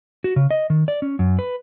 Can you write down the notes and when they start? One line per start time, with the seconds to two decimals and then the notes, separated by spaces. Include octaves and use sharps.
0.24 F#4
0.36 C#3
0.51 D#5
0.70 D#3
0.88 D5
1.02 C#4
1.19 F#2
1.39 B4